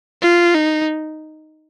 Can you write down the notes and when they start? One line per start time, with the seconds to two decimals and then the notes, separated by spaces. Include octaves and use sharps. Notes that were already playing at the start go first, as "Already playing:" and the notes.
0.22 F4
0.55 D#4